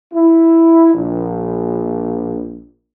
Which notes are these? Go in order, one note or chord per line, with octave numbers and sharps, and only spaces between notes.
E4
A#1